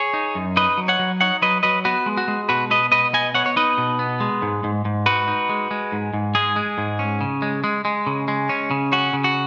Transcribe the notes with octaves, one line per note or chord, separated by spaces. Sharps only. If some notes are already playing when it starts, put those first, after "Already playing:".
Already playing: G#4 C#5
D#4
F#2
D#4 B4 D#5
F#3
C#5 F#5
F#3
D#4 C#5 F#5
F#3 B4 D#5
F#3 B4 D#5
B3 F#4 B4
G#3
F#4
G#3
B2 F#4 B4
B3 B4 D#5
B2 B4 D#5
B3 D#5 G#5
B3 C#5 F#5
C#5
D#4 B4 D#5
B2
B3
G#3
G#2
G#2
G#2
D#4 F#4 B4
D#4
G#3
G#3
G#2
G#2
G#3 G#4
G#3
G#2
C#4
C#3
G#3
G#3
G#3
C#3
G#3
C#4
C#3
C#4 F#4
C#3
F#4